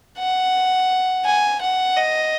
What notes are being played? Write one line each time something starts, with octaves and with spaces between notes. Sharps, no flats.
F#5
G#5
F#5
D#5